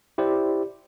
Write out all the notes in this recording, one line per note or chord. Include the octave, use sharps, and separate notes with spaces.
E4 G4 C5 D5